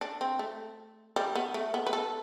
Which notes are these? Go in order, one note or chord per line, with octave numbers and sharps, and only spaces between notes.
D4
C4
A3
G3
B3
A3
B3
B4
A4